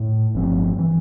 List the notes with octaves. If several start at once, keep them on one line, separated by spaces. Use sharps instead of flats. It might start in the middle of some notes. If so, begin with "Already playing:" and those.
Already playing: A2
G1 G2 F3 C4
E3